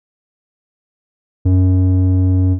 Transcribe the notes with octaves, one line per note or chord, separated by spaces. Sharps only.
F#2